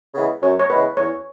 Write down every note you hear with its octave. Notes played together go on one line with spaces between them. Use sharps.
C#3 E3 G#3 B3
F#2 C#5
C#5
C#3 E3 G#3 B3 B4
E2 C#5